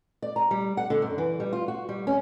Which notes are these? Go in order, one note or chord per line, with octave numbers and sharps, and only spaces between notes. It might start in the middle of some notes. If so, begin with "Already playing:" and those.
D5
A#5
G3
F#5
D3
F#2
E3
G3
F4
F#4
G3
C#4